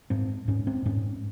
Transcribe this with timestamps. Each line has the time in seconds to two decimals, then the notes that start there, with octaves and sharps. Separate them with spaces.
0.10 G#2 C4
0.48 G#2 C#4
0.67 C4
0.86 G#2 C#4